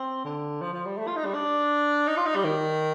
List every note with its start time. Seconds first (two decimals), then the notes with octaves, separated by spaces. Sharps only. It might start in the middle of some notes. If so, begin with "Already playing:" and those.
Already playing: C4
0.24 D3
0.61 F3
0.73 F3
0.86 G3
0.98 A3
1.07 F4
1.16 D#4
1.25 G3
1.34 D4
2.07 D#4
2.17 F4
2.26 D#4
2.35 G3
2.44 D#3